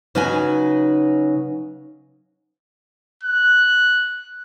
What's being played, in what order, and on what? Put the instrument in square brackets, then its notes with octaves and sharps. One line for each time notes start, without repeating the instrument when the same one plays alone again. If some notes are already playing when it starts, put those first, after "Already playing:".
[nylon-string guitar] C#3 F#3 D#4 B4 G#5
[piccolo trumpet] F#6